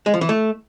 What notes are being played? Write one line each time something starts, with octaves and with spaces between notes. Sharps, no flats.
G#3
F3
E3
A3